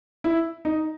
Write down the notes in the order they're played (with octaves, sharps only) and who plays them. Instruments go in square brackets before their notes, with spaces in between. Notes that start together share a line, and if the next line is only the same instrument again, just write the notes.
[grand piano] E4
D#4